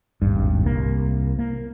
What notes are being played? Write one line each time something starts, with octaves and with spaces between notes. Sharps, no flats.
D#1 G#1 G2
C2 A#3
A#3